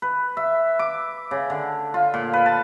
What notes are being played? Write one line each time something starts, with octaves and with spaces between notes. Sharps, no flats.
B4
E5
D6
C#3
D3
F4
A#2
B4
A5